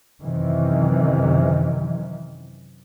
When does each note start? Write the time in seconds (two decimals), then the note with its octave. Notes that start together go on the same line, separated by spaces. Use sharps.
0.20 F#2 C3 D#3 E3